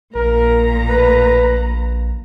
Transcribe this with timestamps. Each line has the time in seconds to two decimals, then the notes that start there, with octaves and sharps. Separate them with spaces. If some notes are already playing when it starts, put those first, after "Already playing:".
0.15 A#1 A#2 A#4 A#5
0.90 B4